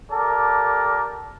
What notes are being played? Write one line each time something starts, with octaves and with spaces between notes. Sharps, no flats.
G4 A4 A#4 D5 A5